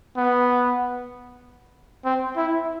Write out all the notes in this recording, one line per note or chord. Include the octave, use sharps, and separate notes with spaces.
B3
C4
E4